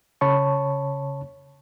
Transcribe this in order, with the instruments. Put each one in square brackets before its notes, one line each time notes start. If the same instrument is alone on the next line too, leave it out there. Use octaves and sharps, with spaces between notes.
[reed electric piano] C#3 C#5 A5 B5 C#6